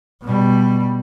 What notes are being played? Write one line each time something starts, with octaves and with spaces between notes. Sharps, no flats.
B2 G3